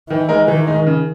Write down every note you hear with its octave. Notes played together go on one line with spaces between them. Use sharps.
D#3 E3
G#3 D#4 A#4
D#3 E3
G#3 D#4
C#3